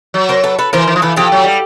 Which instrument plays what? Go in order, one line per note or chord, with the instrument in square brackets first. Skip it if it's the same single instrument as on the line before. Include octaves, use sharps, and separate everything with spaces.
[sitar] F#3
[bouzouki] A#4 C5
A4 B4
A4 B4
[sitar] E3 [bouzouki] A#4 C5
[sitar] E3
F3
[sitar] E3 [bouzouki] A4 B4
[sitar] F3 [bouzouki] G4 A4
[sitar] F#3
G3